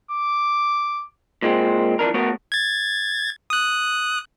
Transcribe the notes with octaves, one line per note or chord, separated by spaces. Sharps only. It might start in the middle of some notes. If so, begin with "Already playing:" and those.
D6
A#2 G#3 C4
F2 E3 D4 A#4
A3 B3 F#4 A#4 C#5
G#6 A6
D#6 F#6